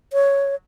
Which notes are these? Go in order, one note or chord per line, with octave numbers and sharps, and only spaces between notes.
C#5